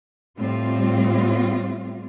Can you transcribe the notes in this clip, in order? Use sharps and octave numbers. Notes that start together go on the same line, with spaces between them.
A2 G3 C4 F4